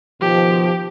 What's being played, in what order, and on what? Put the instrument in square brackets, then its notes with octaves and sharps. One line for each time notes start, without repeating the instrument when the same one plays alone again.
[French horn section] B2 D#3 F3 [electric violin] G4